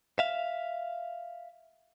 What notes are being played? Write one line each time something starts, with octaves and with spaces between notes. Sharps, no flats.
E5 F5